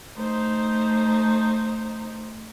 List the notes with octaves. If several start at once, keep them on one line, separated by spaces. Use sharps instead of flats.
A3 D#4 C5